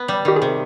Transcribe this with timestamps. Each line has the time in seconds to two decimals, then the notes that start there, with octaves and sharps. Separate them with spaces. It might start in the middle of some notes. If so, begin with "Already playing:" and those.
Already playing: B3
0.08 G3
0.25 D#3 G4
0.36 G#4
0.42 C3